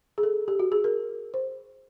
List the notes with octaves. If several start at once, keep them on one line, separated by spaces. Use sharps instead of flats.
G#4
A4
G4
F#4
G#4
A#4
C5